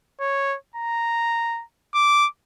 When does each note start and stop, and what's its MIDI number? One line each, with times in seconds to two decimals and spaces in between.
0.20 0.56 73
0.76 1.63 82
1.95 2.27 86